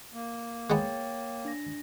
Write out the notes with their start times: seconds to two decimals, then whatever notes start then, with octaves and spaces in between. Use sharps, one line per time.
0.13 A#3
0.70 G#3 B3 C#5 G5 A6
1.45 D4 A#6